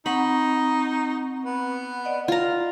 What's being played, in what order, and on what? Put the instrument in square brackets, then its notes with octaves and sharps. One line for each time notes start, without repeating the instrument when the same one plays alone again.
[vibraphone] C4 F#5 C#6 [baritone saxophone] D#4 [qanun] B5
[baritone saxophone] B3
[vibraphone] D5 D#5 F#5
[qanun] F4 A#5